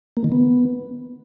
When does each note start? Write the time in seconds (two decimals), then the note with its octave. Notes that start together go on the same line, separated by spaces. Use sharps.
0.17 A#3
0.24 D#3
0.32 B3